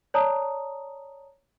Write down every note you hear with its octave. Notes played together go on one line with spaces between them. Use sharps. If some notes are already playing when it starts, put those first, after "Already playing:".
C#5 D5 A5 A#5 D#6